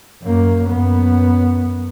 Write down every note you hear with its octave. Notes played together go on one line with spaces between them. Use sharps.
F#2 A#3
F#2 B3